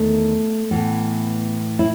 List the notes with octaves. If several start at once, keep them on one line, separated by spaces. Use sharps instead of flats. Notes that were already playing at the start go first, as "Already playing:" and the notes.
Already playing: E2 D#3 A3
A2 E3 B3
E4